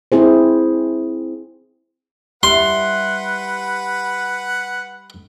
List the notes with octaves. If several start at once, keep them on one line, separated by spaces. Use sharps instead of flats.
C4 E4 G#4 C5
G3 E4 B4 F#5 C6